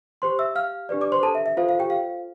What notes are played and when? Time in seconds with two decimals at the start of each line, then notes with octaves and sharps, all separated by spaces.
0.22 G4 C5 C6
0.39 E5 E6
0.55 F5 F6
0.89 D4 G4 B4 D5
1.01 D5 D6
1.12 C5 C6
1.23 A4 A5
1.35 E5
1.46 E5
1.57 F4 A4 C5 F5
1.69 F5
1.79 G4 G5
1.90 F5